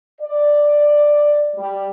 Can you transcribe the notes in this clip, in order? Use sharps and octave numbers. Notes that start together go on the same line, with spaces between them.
D5
G3